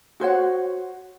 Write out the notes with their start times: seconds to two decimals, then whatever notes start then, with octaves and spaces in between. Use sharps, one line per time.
0.20 F#4 C5 C#5 F#5